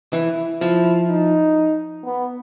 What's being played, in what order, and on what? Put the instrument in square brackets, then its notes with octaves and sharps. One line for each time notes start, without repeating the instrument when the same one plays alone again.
[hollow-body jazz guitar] E3 [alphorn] E4
[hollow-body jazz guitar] F3 [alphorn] E4
[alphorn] D#4
B3